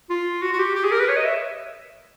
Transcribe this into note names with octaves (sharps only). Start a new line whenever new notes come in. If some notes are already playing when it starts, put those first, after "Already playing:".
F4
F#4
F#4
G4
G4
G#4
A#4
B4
C#5
D#5
E5